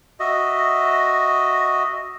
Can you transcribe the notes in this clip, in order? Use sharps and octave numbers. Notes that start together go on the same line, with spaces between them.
F#4 D#5 E5